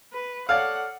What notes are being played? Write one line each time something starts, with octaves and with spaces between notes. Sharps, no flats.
B4
A4 C#5 D5 F5 F#5